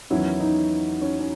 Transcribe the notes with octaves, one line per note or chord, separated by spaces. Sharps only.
E2 D#3 F#3 C#4 E4
D#4
C#4
C#4